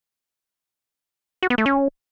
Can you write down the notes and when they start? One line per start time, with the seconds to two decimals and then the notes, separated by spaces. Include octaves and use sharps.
1.43 F#4
1.50 B3
1.58 A3
1.66 C#4